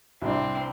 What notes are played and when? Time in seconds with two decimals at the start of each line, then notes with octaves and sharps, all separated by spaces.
0.22 C2 C3 G3 C4 D4